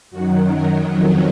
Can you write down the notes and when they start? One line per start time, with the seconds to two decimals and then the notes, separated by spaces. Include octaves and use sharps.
0.11 F#2 D#3 F#3 F#4
0.49 A#4
0.87 F2 D#3 F#3